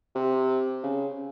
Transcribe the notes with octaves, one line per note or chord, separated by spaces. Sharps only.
C3
C#3